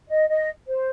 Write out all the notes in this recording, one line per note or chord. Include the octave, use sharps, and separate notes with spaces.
D#5
D#5
C5